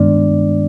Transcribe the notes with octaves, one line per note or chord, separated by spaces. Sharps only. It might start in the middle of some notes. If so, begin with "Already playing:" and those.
Already playing: G2 D#3 G#3 B3 D4 D5